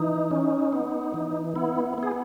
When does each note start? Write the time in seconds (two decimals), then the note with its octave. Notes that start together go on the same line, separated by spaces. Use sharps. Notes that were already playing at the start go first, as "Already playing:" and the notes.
Already playing: E3 D#4
0.31 C#4
0.73 B3
1.14 E3
1.55 B3 E4
1.98 B3 G#4